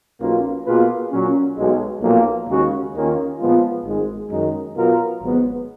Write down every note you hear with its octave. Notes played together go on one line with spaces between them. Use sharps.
B1 B2 A#3 C#4 F4
B2 A#3 F4 G#4 B4
A#2 F#3 C#4
B1 B2 G#3
B1 A#2 F3 A#3
D#2 C#3 G#3 C#4 F#4
D#2 D#3 A#3 C#4 F4
A#2 F3 G#3 B3 F4
G#1 G#2 D#3 G#3
F#2 D#3 G#3 D#4
B2 F#3 B3 F4 A#4
G#1 G#2 F#3 B3 F#4